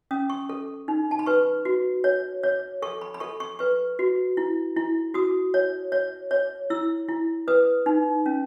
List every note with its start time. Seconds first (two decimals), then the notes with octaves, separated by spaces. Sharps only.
0.11 C#4 D#6
0.30 C#6
0.49 A4
0.88 D#4
1.11 A5
1.19 B5
1.26 B4 C#6
1.65 F#4
2.04 C#5
2.43 C#5
2.82 A4 C#6
3.01 B5
3.14 B5
3.20 A4 C#6
3.40 C#6
3.59 B4 C#6
3.99 F#4
4.37 E4
4.77 E4
5.14 F#4 D#6
5.54 C#5
5.92 C#5
6.31 C#5
6.70 E4 E6
7.08 E4
7.48 B4 D#6
7.86 D#4
8.26 C#4